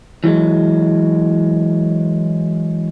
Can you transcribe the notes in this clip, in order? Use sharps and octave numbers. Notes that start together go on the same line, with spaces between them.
E3 F#3 G#3